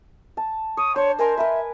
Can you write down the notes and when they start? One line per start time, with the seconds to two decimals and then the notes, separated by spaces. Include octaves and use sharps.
0.37 A5
0.77 C#5 D#6
0.96 D4 C5 C#5
1.18 A#4 D#5 G#5 C6
1.37 A#4 B4 E5